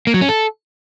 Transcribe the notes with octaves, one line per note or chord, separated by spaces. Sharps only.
A#3
F#3
C#4
A4